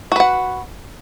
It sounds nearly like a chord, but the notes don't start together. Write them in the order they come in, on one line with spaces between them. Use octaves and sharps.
F#4 B4 F#5